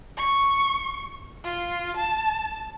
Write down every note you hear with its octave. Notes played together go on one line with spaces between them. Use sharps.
C#6
F4
A5